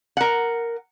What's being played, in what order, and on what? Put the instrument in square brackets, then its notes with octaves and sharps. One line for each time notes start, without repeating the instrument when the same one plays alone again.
[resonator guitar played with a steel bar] A#4 F#5